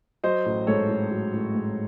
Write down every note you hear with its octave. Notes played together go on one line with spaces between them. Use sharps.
F#3 C5 D#5
A1
G#2 A4 C#5
A1
F#3
A1
G#2